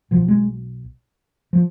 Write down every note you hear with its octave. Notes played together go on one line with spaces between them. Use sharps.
B1 B2 F3
G#3
F3